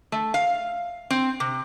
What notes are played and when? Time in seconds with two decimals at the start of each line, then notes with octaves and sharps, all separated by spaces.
0.12 A3
0.34 F5
1.10 C4
1.40 C3